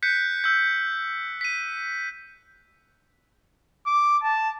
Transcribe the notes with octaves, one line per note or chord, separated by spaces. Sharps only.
F#6 G6 B6 C#7
E6 G6
B6 D#7
D6
A5